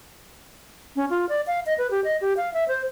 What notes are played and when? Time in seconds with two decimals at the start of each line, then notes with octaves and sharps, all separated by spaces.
0.96 C#4
1.10 F4
1.29 D5
1.47 F5
1.66 D#5
1.78 B4
1.91 G4
2.04 D#5
2.21 G4
2.37 F5
2.54 E5
2.68 C5